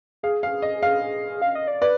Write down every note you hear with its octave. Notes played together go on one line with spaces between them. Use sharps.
G#4 F5
F5
D#5
F5
F5
D#5
D5
B4 D5